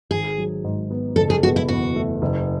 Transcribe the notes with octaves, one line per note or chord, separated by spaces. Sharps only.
G#1 G#4
F#3
G#2
B3
F#1 A4
G#4
B2 F#4
E4
E2 F#4
A3
F#1